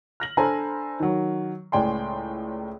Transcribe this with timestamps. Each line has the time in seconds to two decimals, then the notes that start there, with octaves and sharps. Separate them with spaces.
0.20 F6 A#6 F#7
0.37 D4 A4 C5 G#5 A#5 B5
1.00 D#3 F#3
1.72 C#2 A2 D5 G5 G#5 C6